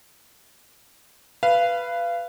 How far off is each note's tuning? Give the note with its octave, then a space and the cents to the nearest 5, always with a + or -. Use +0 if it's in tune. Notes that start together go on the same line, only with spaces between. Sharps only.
B4 +0 F5 -25